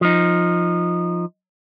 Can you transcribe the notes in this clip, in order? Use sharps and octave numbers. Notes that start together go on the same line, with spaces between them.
F3 D#4